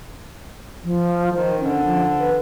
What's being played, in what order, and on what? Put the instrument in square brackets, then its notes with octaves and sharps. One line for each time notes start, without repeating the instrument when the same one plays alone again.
[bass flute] F3
[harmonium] D#3 [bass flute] C5
[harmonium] D3 [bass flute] C#4
[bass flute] F3
B4